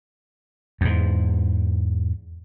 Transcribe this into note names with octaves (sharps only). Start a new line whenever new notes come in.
E2 G#2